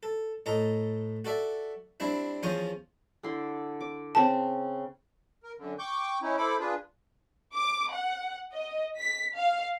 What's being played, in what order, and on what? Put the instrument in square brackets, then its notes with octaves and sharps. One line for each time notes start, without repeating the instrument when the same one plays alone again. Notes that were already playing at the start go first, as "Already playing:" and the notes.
[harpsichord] A4
A2 A4 D#5 A#5
F#4 A4 D5 E5
G3 C4 D4 E4
E2 F3 C#4 C5 C#6 D#6
[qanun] D3 E4 C6
D6
[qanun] C#3 C4 [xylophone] A5
[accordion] A#4
F#2 D3
G5 C#6 D6 G6
C#4 D#4 E4
E4 A4 C5 B5 D6
D4 F4 G#4 B4
[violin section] D6
F#5
D#5
B6
F5